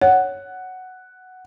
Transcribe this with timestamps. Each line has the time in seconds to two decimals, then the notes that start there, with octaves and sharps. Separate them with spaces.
0.01 C#5 F#5